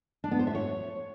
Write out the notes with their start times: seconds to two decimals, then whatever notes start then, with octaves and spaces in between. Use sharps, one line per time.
0.24 D4
0.31 B3
0.39 C5
0.47 E5
0.55 C#5